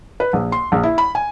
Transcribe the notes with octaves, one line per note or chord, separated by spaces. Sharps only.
B4
A#1
C6
A#1
E4
B5
G#5